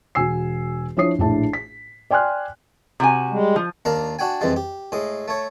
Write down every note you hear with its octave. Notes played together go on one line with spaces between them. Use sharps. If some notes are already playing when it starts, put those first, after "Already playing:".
E1 F#4 G#5 E6 C7
F3 D4 E4 C#5 D#6 C7
A#1 A2 D4 E4 A5
B6
D5 G5 G#5 C6 F6 F#6
C3 F#4 G#5
G3 G#3
F3
D#2 D4 A#4 F5 A#5
D4 F#4 G5 G#5
F2 E3 G3 G#3
G4
A2 G#3 D#6
A3 C#5